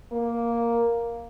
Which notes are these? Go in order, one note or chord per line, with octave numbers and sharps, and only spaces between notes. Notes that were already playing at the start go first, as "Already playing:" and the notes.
A#3